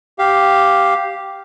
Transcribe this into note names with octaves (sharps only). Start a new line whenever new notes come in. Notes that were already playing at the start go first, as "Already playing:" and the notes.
G4 F5